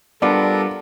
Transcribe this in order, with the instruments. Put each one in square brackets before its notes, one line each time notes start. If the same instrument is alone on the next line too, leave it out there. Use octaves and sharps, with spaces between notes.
[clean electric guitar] G3 B3 F4 [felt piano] D4 [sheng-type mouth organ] A4 A#4